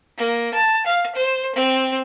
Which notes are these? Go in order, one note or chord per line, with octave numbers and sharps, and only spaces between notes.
A#3
A5
F5
C5
C4